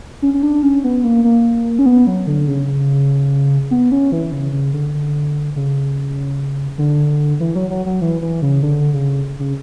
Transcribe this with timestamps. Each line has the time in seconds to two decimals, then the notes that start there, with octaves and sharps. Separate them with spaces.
0.22 C#4
0.34 C#4
0.43 D4
0.63 C#4
0.84 B3
1.04 A#3
1.24 A#3
1.79 C#4
1.86 B3
2.07 F#3
2.27 D3
2.47 C#3
3.71 B3
3.92 C#4
4.12 E3
4.32 C#3
4.53 C#3
4.73 D3
4.94 D3
5.56 C#3
6.78 D3
7.40 E3
7.55 F#3
7.70 F#3
7.86 F#3
8.01 E3
8.22 E3
8.42 C#3
8.62 D3
8.93 C#3
9.39 C#3